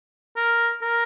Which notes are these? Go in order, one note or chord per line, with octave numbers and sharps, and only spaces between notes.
A#4
A#4